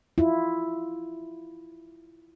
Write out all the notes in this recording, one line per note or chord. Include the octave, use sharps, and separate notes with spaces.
E4 F4